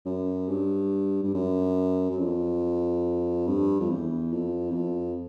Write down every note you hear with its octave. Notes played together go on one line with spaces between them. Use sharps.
F#2
G2
G2
F#2
F#2
F2
G2
F2
E2
F2
E2
F2